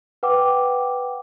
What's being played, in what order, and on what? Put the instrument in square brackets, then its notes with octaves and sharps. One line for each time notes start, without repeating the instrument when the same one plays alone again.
[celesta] B4 F#5 G5 D6